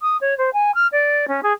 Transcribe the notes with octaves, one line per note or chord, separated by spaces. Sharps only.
D#6
C#5
C5
G#5
F6
D5
C#4
G#4